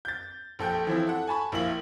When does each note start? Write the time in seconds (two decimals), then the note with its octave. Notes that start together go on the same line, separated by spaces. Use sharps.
0.05 G6 A6
0.59 A#1 A4 G5 G6
0.87 E3 F3 C4 E4
1.07 A4 F#5
1.27 G#5 A5 B5 C#6
1.52 A#1 A#3 E4 F5 F#7